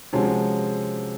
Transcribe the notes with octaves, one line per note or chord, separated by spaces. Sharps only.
C3 F3 G#3 C#4 F#4